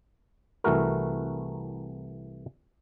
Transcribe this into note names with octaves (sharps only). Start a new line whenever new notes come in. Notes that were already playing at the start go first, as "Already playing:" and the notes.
C2 E3 A3 F#4 A#4